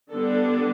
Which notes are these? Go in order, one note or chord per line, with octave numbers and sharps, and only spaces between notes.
D3 G3 B3 D4 A4